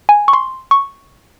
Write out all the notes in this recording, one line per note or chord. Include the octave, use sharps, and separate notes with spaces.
G#5
C#6
C6
C#6